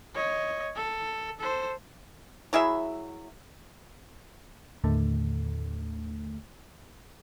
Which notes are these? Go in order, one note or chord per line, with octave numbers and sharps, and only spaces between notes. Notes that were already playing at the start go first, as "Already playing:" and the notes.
C#5 D#5
A4
A4 C5
F#3 E4 G#4 E5
D#2 A2 D3 A3